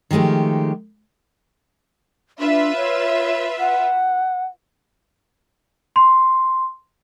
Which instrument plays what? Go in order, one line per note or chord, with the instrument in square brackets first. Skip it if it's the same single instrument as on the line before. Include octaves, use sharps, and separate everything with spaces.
[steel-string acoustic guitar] D#3 F3 G#3 A3 G4
[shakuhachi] D4 [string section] F4 B4 E5
[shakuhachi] C#5
F#5
[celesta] C6